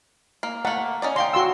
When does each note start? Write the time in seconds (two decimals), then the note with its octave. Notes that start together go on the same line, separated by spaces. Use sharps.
0.43 A#3
0.65 A3 A#3 F#5
1.02 C#4 D#4 D5
1.16 D#5 F5 G5 C6
1.33 F#4 C6 E6